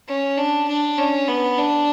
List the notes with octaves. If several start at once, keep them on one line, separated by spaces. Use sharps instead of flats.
C#4
D4
D4
C#4
B3
D4